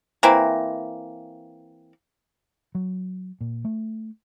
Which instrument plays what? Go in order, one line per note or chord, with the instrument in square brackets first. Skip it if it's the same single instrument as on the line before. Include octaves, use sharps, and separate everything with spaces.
[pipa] E3 A#3 C4
[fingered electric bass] F#3
A#2
A3